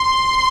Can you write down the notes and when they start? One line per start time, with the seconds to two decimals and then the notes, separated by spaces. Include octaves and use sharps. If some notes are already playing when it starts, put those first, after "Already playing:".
Already playing: C6